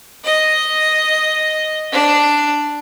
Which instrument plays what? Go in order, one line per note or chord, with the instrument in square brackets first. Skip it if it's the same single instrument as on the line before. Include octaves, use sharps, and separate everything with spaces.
[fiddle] D#5
D4